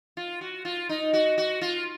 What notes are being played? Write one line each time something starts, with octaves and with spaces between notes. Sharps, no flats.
F4
F#4
F4
D#4
F#4
F#4
F4